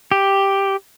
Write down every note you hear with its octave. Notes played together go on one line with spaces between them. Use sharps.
G4